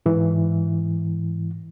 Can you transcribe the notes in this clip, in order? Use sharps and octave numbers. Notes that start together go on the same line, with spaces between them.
G#2 E3